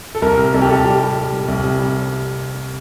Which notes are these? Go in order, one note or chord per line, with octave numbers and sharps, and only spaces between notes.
A4
C2 A#4
C3
C2 A4
G4
C2 A4
G3 G4
G3
G3
G3
C2
C3
G3